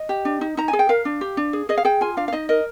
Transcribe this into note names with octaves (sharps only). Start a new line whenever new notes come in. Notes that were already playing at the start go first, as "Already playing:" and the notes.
Already playing: D#5
G4
D4
D#4
D#4 A#5
G#5
G#4
G5
A#4 F5
D4
G4
D4
G#4
G#4 D#5
F5
G#4 G5
F4 G#5
D4 F5
F5
D#4 D#5
A#4 D#5